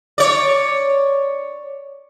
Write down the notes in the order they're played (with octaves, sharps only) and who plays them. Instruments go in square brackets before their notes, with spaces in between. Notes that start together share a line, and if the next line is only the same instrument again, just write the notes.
[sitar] C#5 D5